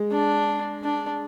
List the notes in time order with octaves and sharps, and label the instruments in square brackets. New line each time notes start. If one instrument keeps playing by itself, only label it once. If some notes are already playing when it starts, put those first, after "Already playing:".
Already playing: [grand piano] G#3
[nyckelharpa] D4
D4